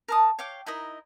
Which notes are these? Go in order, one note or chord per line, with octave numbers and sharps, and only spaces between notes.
A#4 A5 D#6
C#5 F5 G5 D6
D#4 E4 A#4 D#5